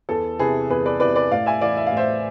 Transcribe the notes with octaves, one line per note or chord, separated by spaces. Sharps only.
E2 A4
C3 E3 G#4 B4
E2 G#4 B4
B4 D5
C3 E3 B4 D5
B4 D5
A2 D5 F5
E5 G#5
E3 D5 F5
E5
F5
A2 C5 E5